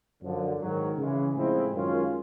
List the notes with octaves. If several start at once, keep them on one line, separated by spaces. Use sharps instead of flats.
F#2 D3 F3
G#2 D#3 F#3
C#3 E3 G#3
A2 F3 G#3 C4 E4
F#2 D#3 G#3 C#4 F4